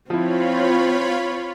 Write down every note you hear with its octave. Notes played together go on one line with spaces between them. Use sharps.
F3 C4 E4 F4 C5 C#5 B5